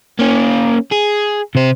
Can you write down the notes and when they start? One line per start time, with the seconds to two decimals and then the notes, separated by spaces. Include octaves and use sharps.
0.19 A#3 C#4
0.92 G#4
1.55 C3 C5